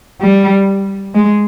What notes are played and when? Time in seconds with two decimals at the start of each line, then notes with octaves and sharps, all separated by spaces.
0.21 G3
1.15 G#3